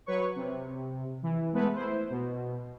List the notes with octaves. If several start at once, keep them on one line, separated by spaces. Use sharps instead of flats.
F#3 B4 C#5 C#6
C3
E3
G#3 A3 B3 B4
E4 C5
B2